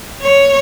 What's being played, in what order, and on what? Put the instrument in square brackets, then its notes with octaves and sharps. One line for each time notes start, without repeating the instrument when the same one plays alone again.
[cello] C#5